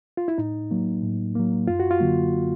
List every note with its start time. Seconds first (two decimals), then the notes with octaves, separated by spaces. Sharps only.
0.17 F4
0.28 E4
0.38 A2 D#4
0.71 F#3 A#3
1.03 A2
1.35 F#3 A#3
1.67 F#2 F4
1.80 F#4
1.91 F4
2.00 D3 F#3 A#3